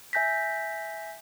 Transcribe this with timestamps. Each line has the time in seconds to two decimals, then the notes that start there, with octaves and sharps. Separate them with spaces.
0.13 E5 G#5 G6 A#6 B6